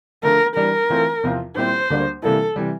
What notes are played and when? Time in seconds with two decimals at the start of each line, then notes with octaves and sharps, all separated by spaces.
0.23 D3 F3 A3 A#4
0.56 E3 G3 D4 A#4
0.90 E3 A3 C4 F4
1.23 E2 C3 F3 C4 F4
1.57 A#2 G3 C4 E4 G4 C5
1.90 D2 D3 G3 A#3 D4
2.22 C3 E3 G3 A#3 E4 A4
2.56 C3 E3 G3